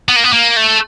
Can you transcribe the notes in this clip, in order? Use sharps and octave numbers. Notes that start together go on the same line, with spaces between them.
B3
A#3
B3
A#3
A3